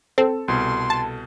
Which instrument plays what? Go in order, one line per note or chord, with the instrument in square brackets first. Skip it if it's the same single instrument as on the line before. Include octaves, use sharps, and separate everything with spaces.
[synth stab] C4 [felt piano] A4
[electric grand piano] C2 B2 [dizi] C6
[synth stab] A5